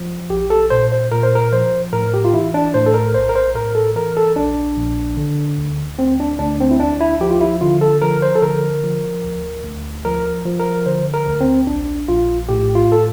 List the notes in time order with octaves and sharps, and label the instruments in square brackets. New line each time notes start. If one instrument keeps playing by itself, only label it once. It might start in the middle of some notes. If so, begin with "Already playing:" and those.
Already playing: [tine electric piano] F3
A#1 G4
A4
A#2 C5
C5
A#2 A#4
C5
A#4
F3 C5
A2 A#4
G4
F4
E3 E4
D4
A2 C5
A4
A#4
A#1 C5
A#4
C5
A2 A#4
A4
E3 A#4
A4
A#1 D4
A#1
D3
D2
D2 C4
D4
D2 D4
C4
E4
D2 D4
E4
F3 G4
F4
E4
D3 F4
A4
F3 A#4
C5
A4
D3 A#4
F3
D2
D2
F3 A#4
F3
A#4
D3 C5
A#4
D2
C4
A#1 D4
A#1 F4
A2 G4
F4
A4